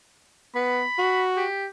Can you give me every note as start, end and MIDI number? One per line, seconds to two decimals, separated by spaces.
0.55 0.83 59
0.55 1.24 83
0.98 1.46 66
1.37 1.68 67